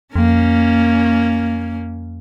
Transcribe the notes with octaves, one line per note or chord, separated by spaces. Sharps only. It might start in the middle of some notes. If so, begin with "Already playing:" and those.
F2 A#3 C#4